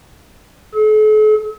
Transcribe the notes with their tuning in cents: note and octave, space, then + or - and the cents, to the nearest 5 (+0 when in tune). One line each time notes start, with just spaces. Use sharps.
A4 -45